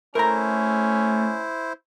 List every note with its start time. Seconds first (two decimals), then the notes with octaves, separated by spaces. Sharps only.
0.15 A3 C#4 E4 A#4 C5 A#5